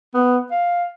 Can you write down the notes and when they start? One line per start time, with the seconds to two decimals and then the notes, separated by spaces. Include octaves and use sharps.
0.14 B3
0.51 F5